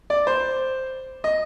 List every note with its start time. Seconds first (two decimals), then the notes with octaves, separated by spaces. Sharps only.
0.10 D5
0.27 C5
1.24 D#5